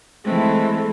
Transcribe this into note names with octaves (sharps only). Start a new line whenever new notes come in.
E3 G#3 A3 C4 A4